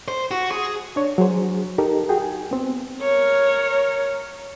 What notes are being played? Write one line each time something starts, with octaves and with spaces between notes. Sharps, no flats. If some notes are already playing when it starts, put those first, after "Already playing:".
C5
F#4
G#4
D4 C#5
F#3 G#4 C5
D#4 G4 A4 A#4
F#4 G#4 G5
G#5
B3 C4
A#4 C#5